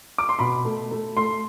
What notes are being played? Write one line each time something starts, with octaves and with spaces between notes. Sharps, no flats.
D6
C6
B2 B5
A3
A3
A3 C6